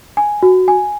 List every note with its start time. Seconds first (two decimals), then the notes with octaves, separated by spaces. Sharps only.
0.17 G#5
0.43 F#4
0.68 G#5